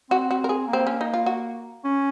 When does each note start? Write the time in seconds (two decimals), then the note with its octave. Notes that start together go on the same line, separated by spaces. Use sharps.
0.10 C4 F#4
0.31 F#4
0.44 A#4
0.49 G#4
0.68 A#3
0.73 C4
0.87 C#4
1.01 D#4
1.14 F4
1.26 F#4
1.84 C#4